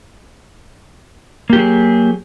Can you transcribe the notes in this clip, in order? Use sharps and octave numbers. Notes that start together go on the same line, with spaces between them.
F#3 A#3 G4 G#4